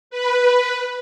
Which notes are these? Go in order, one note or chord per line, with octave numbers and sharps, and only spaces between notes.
B4